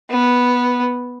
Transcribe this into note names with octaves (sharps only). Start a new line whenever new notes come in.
B3